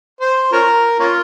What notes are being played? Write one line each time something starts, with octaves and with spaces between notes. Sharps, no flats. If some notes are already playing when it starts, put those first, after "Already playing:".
C5
C#4 F4 A#4
A#3 C#4 F4